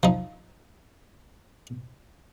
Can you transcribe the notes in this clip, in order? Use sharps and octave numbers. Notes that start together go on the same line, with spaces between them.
F3 D#4